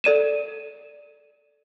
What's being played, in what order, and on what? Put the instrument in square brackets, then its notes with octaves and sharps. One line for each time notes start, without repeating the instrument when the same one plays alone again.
[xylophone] A4 D5 D#7 E7